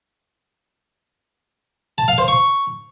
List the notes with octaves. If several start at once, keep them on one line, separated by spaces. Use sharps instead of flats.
A5
F5
C5
C#6